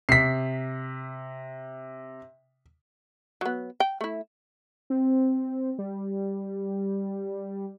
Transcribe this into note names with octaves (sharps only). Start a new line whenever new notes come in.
C3 B6 C7
F#3 B3
G5
A3 E4
C4
G3